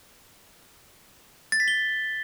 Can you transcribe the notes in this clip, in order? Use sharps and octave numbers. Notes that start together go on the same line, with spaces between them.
A6
B6
G7